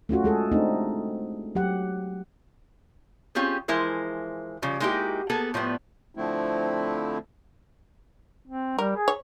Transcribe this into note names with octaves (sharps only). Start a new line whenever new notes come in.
A3 C#4 F4 F#4
G#3 G#4 A4
A3 C4 D4 D#4
F#3 G4 F#5
C4 C#4 F4 G4 G#4
E3 F3 G#3 E4 A#4 C5
C#3 F3 G3
G#3 A#3 D#4 E4 F#4 G4
A#3 B3 G#4 A4
A2 F3 G3 B3
D3 F3 A3 C4 E4
C4
G3 A#4
G#4
C#5